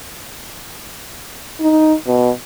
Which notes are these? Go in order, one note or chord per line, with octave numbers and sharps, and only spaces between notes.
D#4
B2